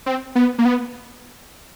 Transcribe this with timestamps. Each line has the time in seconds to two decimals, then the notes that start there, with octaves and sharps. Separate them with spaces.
0.06 C4
0.35 B3
0.58 A#3
0.65 B3